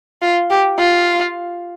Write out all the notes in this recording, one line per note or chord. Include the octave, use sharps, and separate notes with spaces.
F4
G4
F4